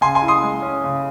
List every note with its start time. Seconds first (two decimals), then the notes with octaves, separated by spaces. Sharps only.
0.01 C#3 G#5 C6
0.15 G#5 C6
0.22 E4
0.28 C6 D#6
0.43 G#3
0.62 C#4
0.84 C#3